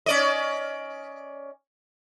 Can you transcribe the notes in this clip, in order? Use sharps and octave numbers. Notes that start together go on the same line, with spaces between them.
C#4 D5 D#5